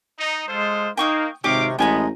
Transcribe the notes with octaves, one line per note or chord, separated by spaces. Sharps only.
D#4
G#3 F4 A4 C5
A#3 D#4 G5 C#6 D#6
G#1 C3 G4 C#5 D#5 F5 G5 D6
A1 G#3 B3 G5 G#5 A#5